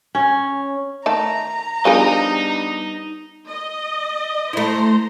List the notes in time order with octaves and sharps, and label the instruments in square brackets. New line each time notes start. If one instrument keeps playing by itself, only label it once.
[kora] C#4
[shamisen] D#3 A3 A5 [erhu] A#5
[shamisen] F3 G#4 A#4 [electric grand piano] G3 B3 D4 [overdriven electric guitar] D#4 D#5
[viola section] D#5
[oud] A3 E4 [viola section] C5 A#5 C6